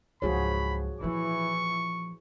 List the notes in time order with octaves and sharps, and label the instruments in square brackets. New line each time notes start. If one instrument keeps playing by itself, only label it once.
[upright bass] C#2 F#3 [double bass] G#2 F3 [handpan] F#4 G#4 C#5 [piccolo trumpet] B5
[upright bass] A#2 F3 [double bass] E3 E4 [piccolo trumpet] C#6